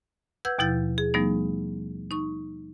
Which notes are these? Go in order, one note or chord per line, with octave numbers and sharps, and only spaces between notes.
B4 F#5 E6 G6 G#6
D#2 B2 F3 E4 G6 A6
G#4
F3 G3 A3 B3 D#4
D#4 C#6